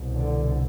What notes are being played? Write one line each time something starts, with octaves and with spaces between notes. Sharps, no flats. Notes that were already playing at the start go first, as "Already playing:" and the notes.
Already playing: C2 B2
D3